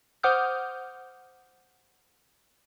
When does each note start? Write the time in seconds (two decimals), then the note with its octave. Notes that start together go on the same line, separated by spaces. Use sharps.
0.23 C5 F#5 D6 D#6 F6 G6